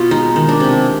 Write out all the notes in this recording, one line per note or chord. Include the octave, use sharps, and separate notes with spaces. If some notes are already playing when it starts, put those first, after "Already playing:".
Already playing: B2 F4
G#3 D#4
D#3
D4
C3